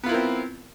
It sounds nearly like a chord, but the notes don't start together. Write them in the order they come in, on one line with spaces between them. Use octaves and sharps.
B3 F4 E4 A#4 C4